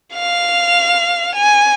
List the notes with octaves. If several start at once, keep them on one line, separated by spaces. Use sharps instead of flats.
F5 F7
G#5